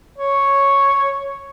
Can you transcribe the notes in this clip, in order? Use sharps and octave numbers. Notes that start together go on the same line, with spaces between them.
C#5